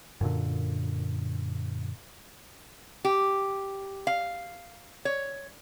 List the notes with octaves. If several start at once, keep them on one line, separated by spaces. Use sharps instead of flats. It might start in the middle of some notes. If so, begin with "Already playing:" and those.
F#2 A#2 D3
G4
F5
C#5